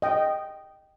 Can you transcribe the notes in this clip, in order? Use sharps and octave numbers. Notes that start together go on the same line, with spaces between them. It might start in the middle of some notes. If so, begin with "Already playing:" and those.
D#5 G5